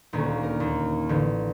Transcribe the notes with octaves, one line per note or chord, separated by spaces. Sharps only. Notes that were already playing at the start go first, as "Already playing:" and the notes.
D#1 D2 A#3 C#4
A#4
D#2
A1 D3